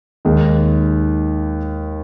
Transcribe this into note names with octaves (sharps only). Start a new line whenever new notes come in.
D#2 D#3 G#3